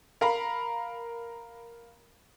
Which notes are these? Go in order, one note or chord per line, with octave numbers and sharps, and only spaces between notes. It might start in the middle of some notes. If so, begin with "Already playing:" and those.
A#4 F5 A#5 B5